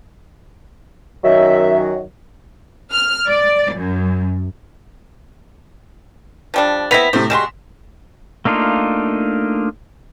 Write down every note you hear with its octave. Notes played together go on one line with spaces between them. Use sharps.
F#2 D#3 F#3 E5
F6
D5
F#2
F3 G3 D4
B3 C4 E4 A#6 B6 F7
A2 C3 C5
G3 G#3 F#4 C6 E7
A3 A#3 D4 D#4 F4